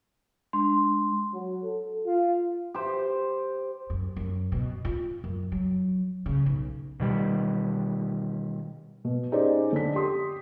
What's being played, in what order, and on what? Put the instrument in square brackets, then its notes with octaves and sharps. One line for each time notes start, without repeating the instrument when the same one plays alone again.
[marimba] G#3 D4 [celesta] C6
[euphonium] F#3
A4
F4
[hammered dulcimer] G4 C5
[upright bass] F#2
F#2
B2
F4
F#2
F#3
C#3
B1
[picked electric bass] B2 D#3 G3
[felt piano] B2
C#4 D#4 G4 G#4 C5 D5
D3 B6
G4 C6 D#6